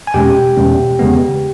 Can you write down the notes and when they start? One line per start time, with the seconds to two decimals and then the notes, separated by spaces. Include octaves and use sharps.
0.07 G#5
0.14 E2 B2 G#3 C#4 G4 G5
0.57 E2 B2 G#3 C#4
0.99 E2 C#3 G#3 B3